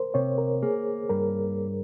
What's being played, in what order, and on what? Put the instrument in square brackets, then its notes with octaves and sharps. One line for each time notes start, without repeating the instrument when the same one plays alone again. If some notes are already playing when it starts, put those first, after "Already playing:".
Already playing: [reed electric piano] A#4 C5
[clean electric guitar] C3 [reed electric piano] C#5
[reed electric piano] A#4
[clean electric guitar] A#3 [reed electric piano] G#4
[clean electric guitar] G2 [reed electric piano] A#4